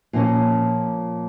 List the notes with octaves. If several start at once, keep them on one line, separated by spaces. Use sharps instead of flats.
A#2 F3 A#3 C#4